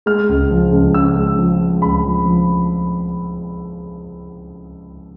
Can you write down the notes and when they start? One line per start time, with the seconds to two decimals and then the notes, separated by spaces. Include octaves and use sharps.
0.06 G#3 F6
0.29 C#2
0.50 F3
0.72 C#2
0.94 C#3 E6
1.16 G#3
1.39 F3
1.60 G#3
1.82 C#2 B5
2.03 F3
2.26 F3